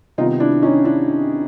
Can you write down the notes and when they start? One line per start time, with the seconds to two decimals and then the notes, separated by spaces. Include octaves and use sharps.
0.18 C3 D#3 G3 B3 D#4 F4
0.40 D4 E4
0.62 C#4 D#4
0.85 D4 E4